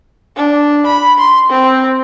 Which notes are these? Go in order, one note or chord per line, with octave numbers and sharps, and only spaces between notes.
D4
B5
C6
C4